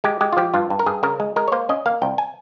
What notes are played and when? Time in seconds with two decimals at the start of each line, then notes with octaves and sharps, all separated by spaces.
0.04 G#3 G4
0.21 G#3 G4
0.33 F4
0.37 F3 G4
0.54 G2 F4
0.70 G2
0.79 A#4
0.86 G2 G#4
1.03 C#3 A#4
1.20 G#3
1.36 G#3 A#4
1.48 C#5
1.52 A#3 C5
1.69 C#4 D#5
1.86 A#3 F5
2.02 C2 G5
2.18 G#5